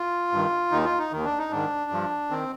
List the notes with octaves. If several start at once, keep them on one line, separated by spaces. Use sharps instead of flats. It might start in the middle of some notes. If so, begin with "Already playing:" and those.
Already playing: F4
G2 D#3
D#2 D#3 D#4
F4
D#4
D#2 D#3
D4
D#4
G#2 D#3 D4
G2 F3
D#3 C4